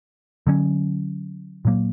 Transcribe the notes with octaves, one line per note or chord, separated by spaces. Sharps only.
D3 F#3 C#4
A#2 F#3 A#3